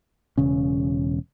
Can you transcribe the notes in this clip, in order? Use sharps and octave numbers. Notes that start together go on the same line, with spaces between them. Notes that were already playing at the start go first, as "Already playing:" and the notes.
E1 C#3 C#4